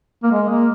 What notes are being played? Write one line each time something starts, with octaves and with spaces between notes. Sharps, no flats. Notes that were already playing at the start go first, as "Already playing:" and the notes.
A#3
G#3
A#3